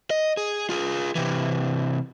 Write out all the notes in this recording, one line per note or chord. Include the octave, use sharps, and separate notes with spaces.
D#5
G#4
F4 G#4
C3 E3